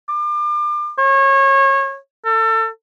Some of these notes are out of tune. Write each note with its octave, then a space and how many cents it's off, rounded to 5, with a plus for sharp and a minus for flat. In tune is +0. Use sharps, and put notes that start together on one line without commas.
D6 +35
C#5 -25
A4 +30